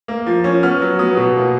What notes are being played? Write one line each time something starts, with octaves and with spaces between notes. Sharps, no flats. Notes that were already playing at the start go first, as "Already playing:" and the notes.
A#3
F3
C#4
B3 F6
F#3
B3 D#6
B2
A#3